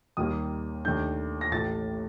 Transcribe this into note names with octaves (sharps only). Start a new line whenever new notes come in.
D#2 D#3 G3 A#3 D#6
D#2 D#3 A3 D4 G6
A#6
A1 A2 A3 A6